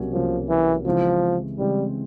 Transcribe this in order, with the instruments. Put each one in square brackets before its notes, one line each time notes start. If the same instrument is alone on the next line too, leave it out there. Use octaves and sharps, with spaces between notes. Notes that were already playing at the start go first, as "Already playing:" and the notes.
Already playing: [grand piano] C2 B2 F#3 A#3 C#4
[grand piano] C2 B2 F#3 A#3 C#4 [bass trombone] F3
[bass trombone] E3
[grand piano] C#3 E3 G#3 C4 E4 [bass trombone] F3
[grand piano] C#3 E3 G#3 C4 E4 [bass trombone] G3